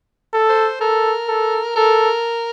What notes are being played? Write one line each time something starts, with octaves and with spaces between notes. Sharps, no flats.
A4
C5
A4 A#4
A4
A4 A#4